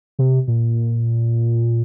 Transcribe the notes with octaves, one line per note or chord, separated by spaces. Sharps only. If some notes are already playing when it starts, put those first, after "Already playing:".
C3
A#2